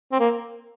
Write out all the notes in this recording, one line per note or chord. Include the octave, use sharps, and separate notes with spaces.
C4
A#3